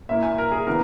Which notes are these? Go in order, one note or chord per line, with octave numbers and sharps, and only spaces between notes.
A#2 A#3 E4 E5
G#5
A#4
G#4
C#3 E3 B3 A#4